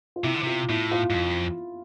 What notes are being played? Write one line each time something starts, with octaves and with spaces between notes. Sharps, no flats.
F4
C3 E4
D3
C3 F4
A2 E4
F4
G#2
F2